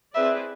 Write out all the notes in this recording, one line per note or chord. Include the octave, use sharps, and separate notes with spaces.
C4 E4 G#4 B4 D5 E5